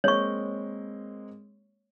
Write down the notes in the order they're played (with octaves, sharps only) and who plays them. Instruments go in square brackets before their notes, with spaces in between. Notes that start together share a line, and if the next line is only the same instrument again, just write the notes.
[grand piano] G#3 A#3 C4 [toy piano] C#5 C#6